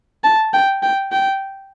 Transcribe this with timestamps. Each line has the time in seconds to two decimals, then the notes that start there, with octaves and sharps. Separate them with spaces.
0.24 A5
0.53 G5
0.83 G5
1.12 G5